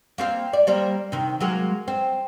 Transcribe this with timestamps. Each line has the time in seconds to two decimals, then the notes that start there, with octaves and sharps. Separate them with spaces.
0.18 A#3 C4 F5
0.53 D5
0.67 G3 A#3 C4
1.12 C3 D#3
1.40 F#3 G#3 A#3
1.88 C4